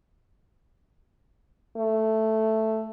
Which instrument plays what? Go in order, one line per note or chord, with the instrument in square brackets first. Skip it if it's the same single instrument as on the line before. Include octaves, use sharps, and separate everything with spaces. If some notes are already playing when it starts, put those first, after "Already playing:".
[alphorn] A3